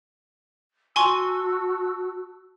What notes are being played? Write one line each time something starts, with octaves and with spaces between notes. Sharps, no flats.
F#4 G#5 A5 C6 C#6 E6